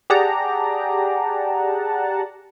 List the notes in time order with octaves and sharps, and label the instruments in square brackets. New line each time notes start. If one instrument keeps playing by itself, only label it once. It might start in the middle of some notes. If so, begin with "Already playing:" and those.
[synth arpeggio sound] G4 G#4 D5 F#5 A5 A#5